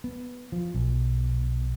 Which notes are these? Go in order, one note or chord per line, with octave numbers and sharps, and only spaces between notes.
B3
F3
B1